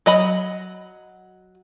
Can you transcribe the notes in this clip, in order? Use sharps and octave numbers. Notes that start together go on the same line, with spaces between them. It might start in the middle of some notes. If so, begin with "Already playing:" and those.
F#3 D#5 B5